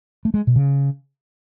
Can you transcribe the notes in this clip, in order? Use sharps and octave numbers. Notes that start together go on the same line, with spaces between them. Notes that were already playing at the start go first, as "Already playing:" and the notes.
A3
G#3
B2
C#3